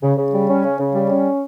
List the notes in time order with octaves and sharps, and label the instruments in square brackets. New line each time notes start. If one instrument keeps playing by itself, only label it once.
[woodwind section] C#3
C#3
G3
C#4
C#3
C#3
G3
C#4